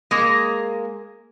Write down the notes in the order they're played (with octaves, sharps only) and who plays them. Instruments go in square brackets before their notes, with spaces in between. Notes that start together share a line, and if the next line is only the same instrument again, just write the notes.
[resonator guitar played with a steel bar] G#3 A#3